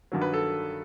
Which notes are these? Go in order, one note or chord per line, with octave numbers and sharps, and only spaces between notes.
G2 D#3 F#3
B4
A4